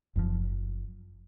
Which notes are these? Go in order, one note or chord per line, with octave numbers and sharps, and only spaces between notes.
F#1 F#2 C#3 F3